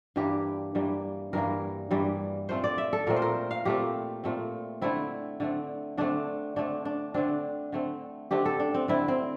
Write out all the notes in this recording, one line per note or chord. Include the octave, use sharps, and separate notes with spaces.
G2 E3 G3 A#3 G4
G2 E3 G3 A#3
G2 E3 G3 A#3 A#4
G2 E3 G3 A#3
A#2 A3 C4 C5
D5
E5
A4
A#2 A3 C4 A#4
C5
A#4
F5
A#2 A3 C4 G4
A#2 A3 C4
D3 A3 C4 E4
D3 A3 C4
D3 A3 C4 D4
D3 A3 C4 D4
D4
D3 A3 C4 D4
D3 A3 C4
D3 A3 C4 G4
A4
D4
C4
D3 A3 C4 E4
C4